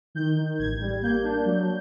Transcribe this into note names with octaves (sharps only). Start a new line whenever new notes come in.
D#3 G6
D#3
A1 G#6
G3
A#3 G6
D4
F#3